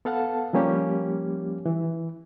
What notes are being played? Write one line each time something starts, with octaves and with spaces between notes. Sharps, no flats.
B3 A4 F5 F#5 A5
F3 G3 A#3 C#4 G4
E3